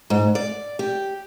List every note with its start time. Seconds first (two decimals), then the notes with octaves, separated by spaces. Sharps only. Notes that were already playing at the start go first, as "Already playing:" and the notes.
0.10 G#2
0.35 D5
0.79 G4